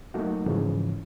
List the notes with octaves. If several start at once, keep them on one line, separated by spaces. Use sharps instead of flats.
F#3 A3 A#3 D#4 F#4
G#2 C#3 E3 F3